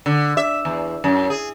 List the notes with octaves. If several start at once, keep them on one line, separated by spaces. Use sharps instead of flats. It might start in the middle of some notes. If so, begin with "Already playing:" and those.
D3
E5
E2
F#2
G#4